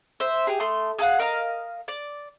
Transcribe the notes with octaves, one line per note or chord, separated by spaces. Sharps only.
C5 E5
G4 G#4
A3 C6 D#6
G#4 A4 F5 F#5
A#4 D#5 F5
D5